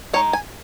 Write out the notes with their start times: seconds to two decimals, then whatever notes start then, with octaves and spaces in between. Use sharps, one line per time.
0.13 G#3 D#4 C#5
0.33 G#5